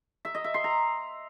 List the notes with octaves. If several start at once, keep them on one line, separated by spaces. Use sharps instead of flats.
E5
D#5
E5
C6
A#5